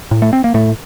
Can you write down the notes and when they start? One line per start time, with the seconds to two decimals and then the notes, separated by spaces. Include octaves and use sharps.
0.11 A2
0.22 A3
0.33 C4
0.44 A#3
0.54 A2 A3